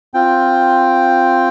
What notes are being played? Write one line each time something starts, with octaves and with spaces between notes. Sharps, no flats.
C4 F4 G5